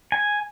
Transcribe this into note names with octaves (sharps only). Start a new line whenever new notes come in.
G#5